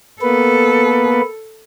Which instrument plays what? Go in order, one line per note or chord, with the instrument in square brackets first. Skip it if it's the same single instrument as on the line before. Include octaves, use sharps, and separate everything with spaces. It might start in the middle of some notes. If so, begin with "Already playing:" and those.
[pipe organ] A#3 B3 B4 [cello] A4